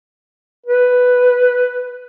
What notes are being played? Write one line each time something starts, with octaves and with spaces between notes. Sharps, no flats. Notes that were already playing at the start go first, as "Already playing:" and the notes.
B4